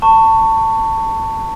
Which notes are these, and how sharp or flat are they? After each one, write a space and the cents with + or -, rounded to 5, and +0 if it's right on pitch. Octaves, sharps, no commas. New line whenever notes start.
A5 +25 C#6 +0